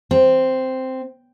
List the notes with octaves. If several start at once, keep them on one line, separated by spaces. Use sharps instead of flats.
C4